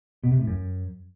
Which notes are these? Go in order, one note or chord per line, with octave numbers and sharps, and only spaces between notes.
B2
C3
A2
F#2